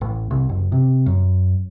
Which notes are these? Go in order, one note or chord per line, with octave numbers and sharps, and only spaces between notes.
A1
C2
F#1
C3
F#2